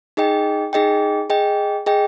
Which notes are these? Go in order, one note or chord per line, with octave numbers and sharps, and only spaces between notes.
D#4 G#4 D#5 G5
D#4 G#4 D#5 G5
G#4 D#5 G5
G#4 D#5 G5